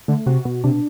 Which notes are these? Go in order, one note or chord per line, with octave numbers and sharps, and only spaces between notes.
D3 A3
C3 F#4
B2
C3 D4